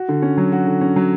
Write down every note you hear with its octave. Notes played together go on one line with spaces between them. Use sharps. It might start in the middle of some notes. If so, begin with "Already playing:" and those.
Already playing: F#4
D3
C#4
F#3
F#4
D3
C#4
F#3